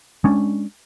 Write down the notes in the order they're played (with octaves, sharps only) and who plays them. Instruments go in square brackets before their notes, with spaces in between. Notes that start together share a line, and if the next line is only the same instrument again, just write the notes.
[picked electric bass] G#3 C#4 D4